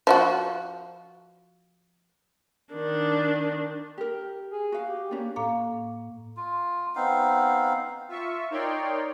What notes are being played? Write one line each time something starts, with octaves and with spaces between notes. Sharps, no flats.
F3 E4 F#4
D#3 D4
G4 A#4
G#4
F#4 F5
G4
A#3 C#4 D4
A2 A#3 A4 F5 A#5 D6
F4
B3 C4 D#4 F5
F4 E5 C#6
D#4 A#4 C#5 D5 G5 C6